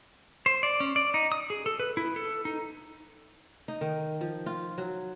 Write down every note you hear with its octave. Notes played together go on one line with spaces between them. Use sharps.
C5
D5
C#4
D5
D#4
D#6
G#4
A4
B4
E4
A4
D#4
D#4
D#3
F3
F4
F#3